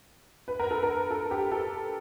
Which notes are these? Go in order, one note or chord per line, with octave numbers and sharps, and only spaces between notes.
B4
A#4
A4
A#4
A4
G4
A4